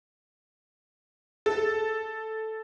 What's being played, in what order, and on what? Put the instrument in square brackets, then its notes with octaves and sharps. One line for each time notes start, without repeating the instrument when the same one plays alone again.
[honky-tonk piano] A4